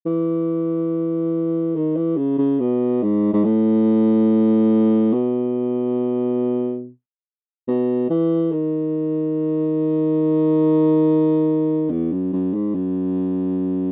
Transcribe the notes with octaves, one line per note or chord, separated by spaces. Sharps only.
E3
D#3
E3
C#3
C#3
B2
G#2
G#2
A2
B2
B2
E3
D#3
E2
F#2
F#2
G#2
F#2